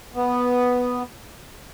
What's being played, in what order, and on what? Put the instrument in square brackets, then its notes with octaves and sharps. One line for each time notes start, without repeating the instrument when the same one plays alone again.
[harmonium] B3